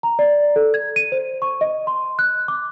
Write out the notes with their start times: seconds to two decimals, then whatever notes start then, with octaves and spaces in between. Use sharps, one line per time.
0.03 A#5
0.19 D5
0.56 A4
0.74 G#6
0.96 D#7
1.12 C5
1.42 C#6
1.61 D#5
1.87 C6
2.19 F#6
2.48 D6